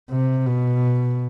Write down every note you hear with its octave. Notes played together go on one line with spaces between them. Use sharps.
C3
B2